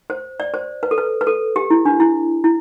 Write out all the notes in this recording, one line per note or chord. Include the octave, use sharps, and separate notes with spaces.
C5
D5
C5
B4
A4
B4
B4
A4
G4
E4
D4
E4
E4